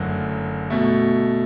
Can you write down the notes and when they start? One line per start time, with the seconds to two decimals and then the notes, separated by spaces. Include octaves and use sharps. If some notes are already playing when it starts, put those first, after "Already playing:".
Already playing: F#1 F#2 D3 F#3 A3
0.70 B2 A3